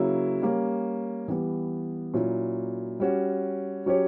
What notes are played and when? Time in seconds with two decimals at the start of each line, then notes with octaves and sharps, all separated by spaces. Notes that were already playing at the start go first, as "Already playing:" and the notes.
Already playing: C#3 F#3 A#3 C#4 E4
0.42 G3 A#3 C#4
1.28 E3 G3 B3
2.14 A#2 F#3 C#4 E4
3.00 G3 C#4 F#4
3.86 F#3 C#4 G4 C#5